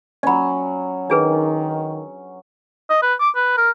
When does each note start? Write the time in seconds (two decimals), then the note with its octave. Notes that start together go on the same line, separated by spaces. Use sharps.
0.23 F#3 C#4 D5 B5
1.10 D#3 D4 G#4 B4
2.90 D#5
3.02 B4
3.20 D6
3.36 B4
3.57 A#4